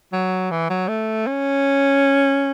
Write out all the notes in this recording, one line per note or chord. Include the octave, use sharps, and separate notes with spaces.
F#3
E3
F#3
A3
C#4